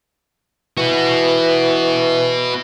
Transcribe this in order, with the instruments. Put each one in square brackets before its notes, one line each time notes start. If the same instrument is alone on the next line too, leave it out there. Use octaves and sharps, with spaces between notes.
[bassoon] E3 [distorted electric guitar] B3 F#4